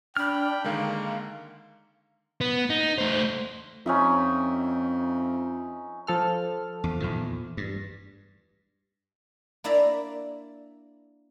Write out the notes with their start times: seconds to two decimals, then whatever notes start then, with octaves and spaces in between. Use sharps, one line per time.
0.17 D4 G5 B5 F6
0.64 D3 D#3 G#3 A#3 F5
2.41 B3
2.70 D#4
2.98 A3 C5
3.86 F2 C#4 D#4 E5
6.07 F3 A4 F6
6.84 E2
7.00 E2 A#2 D#3
7.57 G2
9.64 A#3 D4 E4 D5 E5 A#5